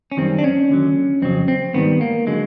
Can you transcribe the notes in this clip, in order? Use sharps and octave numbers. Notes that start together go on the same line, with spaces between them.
C#4
F#2 D#3 G3 C4
D4
C#4
D#2 D3 F#3
F2 C#3 F#3 C4
C4
G#2 D#3 G3 B3
A#3
D3 F#3 G#3